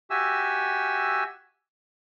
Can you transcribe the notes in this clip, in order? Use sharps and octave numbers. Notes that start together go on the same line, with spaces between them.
F#4 G4 E5 G#5 E6